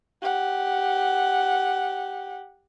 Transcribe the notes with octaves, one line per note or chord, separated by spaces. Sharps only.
G4 F#5